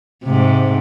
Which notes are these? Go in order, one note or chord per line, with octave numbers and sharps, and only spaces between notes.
G#2 C3